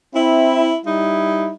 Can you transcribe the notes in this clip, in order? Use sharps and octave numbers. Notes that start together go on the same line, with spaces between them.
C4 E4
G3 D#4 E4